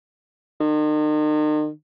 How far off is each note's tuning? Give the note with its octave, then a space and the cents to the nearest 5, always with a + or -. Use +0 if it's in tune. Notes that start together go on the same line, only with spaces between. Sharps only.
D#3 -40